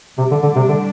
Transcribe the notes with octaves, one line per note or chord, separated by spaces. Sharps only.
A2 C3 G3 D4
D3
D3
C3
D3